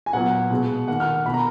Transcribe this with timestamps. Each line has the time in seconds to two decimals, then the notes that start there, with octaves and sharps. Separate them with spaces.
0.06 G#5
0.13 A#2 F#3 B3 F#5
0.51 B2 G#3 B3
0.88 D#3 A#3 F#5
1.00 F6
1.25 B2 A#3 B5
1.34 A#5